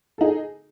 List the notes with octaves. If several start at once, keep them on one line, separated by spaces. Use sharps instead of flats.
D#4 G#4 A4